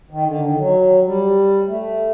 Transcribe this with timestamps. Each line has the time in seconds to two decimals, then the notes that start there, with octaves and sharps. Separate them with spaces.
0.11 D#3
0.26 D3
0.42 D#3
0.57 F#3
1.04 G3
1.67 A3